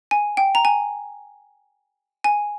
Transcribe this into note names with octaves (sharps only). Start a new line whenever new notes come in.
G#5
G5
A#5
G#5
G#5